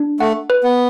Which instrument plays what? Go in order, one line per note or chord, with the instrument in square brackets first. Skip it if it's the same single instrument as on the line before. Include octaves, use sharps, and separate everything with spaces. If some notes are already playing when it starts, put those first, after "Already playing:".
Already playing: [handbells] D4
[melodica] A3 [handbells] F#5
[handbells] B4
[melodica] B3